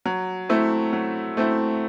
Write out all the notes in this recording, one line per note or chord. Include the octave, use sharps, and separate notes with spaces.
F#3
A3 C4 E4
F#3
A3 C4 E4